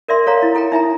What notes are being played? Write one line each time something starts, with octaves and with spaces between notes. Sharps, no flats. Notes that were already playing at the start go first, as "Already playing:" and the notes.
A#4 D5 E5 C6
A4 C#5 F5 A#5
E4
E4 A4 G5 A#5
D#4 E5 G#5 A#5